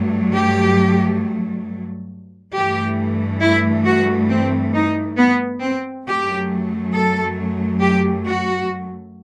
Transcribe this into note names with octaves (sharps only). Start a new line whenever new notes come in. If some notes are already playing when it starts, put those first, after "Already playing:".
Already playing: G2 F#3 A3
G4
G2 E3 A3 G4
E4
F#4
C4
D#4
B3
C4
F#2 F#3 A3 G4
A4
G4
F#4